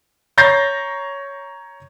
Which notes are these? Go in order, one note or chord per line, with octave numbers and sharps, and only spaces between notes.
C#5 A#5 G6 A6 A#6 C7